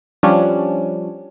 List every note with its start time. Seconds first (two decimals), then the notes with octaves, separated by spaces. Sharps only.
0.23 F3 G3 C#4 D4